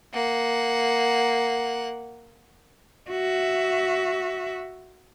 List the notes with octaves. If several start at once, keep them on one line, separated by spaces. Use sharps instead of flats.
A#3 F#5
F#4 E5